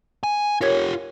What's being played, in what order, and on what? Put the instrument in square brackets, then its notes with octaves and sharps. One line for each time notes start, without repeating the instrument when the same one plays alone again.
[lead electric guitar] G#5
[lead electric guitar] F4 G4 [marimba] A#4 C#5 G#6